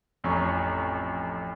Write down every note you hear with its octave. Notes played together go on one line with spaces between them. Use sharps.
A1 F2 C#4 G#5 A#5 C#6